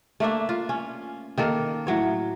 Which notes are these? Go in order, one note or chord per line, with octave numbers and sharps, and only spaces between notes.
A3 A#3 D4 E5
F4
C#4
D#3 A#3 A4
A2 F#3 C#5